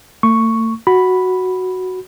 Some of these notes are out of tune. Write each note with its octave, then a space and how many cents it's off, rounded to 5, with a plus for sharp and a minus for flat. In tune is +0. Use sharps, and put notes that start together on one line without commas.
A3 +40 C#6 +0
F#4 +0 B5 +0